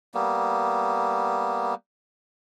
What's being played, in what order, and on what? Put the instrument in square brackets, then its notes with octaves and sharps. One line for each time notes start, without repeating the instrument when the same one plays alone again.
[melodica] G3 A#3 B3